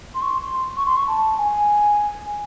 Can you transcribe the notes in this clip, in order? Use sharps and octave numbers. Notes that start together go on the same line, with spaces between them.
C6
C#6
C6
C#6
C6
C#6
A5
G#5